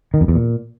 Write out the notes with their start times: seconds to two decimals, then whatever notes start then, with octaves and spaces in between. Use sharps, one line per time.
0.14 D#3
0.21 F2
0.28 E2
0.35 A#2